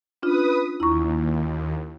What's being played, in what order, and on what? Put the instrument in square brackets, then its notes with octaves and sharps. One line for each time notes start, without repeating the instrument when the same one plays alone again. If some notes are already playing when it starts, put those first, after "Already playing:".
[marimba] C#4 D4 F4 [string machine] B4 D#6
[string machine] D#2 [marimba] E4 A#5 C#6